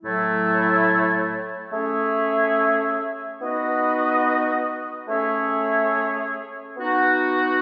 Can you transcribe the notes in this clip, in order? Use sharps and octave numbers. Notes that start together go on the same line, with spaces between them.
A2 F#3 A3 E4
A3 C#4 G#4 C#5 E5
B3 D#4 F#4 B4 D#5
A3 C#4 G#4 C#5 E5
B3 D#4 F#4